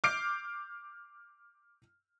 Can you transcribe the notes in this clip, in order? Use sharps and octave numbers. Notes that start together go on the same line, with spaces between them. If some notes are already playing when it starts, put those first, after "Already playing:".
D6 F6 G6 C7 D7